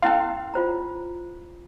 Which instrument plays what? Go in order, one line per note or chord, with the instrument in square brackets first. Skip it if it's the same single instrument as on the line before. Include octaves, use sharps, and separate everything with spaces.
[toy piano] C#4 E4 C6 [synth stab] A4 F5
[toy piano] F4 C5 A#5